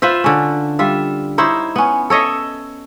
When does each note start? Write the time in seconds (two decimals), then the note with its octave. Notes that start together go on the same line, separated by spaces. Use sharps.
0.02 F4 B4 C5 E5
0.24 D3 C#4
0.79 G3 F4 E5
1.38 D#4 E4 C5 C#5
1.76 B3 C#4
2.10 A4 C#5 D#5 E5